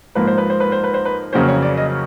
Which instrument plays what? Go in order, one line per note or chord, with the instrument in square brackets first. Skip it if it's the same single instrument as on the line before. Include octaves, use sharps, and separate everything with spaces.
[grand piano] G#2 F3 A#3 B4
C5
B4
C5
B4
C5
B4
C5
B4
F2 C#3 F#3 A#3 C#4 C5
C#5
D5
D#5